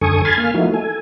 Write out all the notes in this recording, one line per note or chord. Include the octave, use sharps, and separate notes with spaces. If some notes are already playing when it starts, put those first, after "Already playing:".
F#2 D3 A4 G#5 C#6 D#6
G#5 B5 C6 F6 G#6 A6
A#3 F5 G#5 F6
F3 A3 A#3 D#4 E4 F#4
A4 G#5